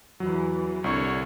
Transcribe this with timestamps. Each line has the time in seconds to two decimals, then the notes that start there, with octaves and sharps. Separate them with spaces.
0.20 E2 E3 F#3
0.84 C2 D3 C#5 C#6